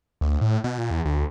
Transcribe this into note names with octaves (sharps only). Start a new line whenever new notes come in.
D2
A2
B2
A#2
E2
D2